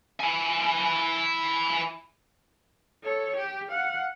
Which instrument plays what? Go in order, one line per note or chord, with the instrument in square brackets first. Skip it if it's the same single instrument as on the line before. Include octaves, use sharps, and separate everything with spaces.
[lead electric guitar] E4 G#5
[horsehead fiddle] A4 C#5
G4
F5 F#5